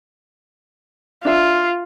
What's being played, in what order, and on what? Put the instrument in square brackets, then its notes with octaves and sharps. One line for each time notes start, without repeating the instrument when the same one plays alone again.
[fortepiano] D4 E5 [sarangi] F4